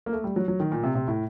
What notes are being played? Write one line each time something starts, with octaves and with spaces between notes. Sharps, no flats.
A#3
A3
G3
F#3
F#3
D#3
A#2
C3
C3
A2